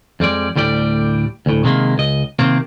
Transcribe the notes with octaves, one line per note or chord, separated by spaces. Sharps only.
F2 G3 G#3 D5
D2 A2 G3 G4 D5
D2 A2
C3 D#3 G#3 A#3
C#2 D#5
C3 D#3 A#3 C4